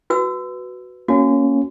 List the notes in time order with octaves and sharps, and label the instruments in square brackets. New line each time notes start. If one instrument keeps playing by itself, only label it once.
[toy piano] F#4 B4 E6
[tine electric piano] A#3 C#4 [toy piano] F#4